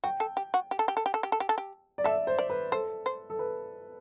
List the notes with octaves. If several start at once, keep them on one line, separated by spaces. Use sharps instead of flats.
F#4 G5
A4
G4
F#4
G4
A4
G4
A4
G4
A4
G4
A4
G4
A4
G4
D5
A4 E5
C5
D5
B4
A4 C5
C5
A4
B4